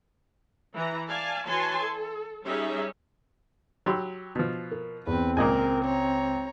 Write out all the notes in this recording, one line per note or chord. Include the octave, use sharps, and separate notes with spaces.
E3 A#5
D5 F5 G#5 A5
E3 F#4 C#5 G#5 A5 C6
A4
G3 C#4 D#4 G4 G#4 E5
F#3 G4 B5 C6 E6
B2 F3
A#4
E2 C4 B4
C#2 A#2 A#4 D#5 G#5
C#5 A#5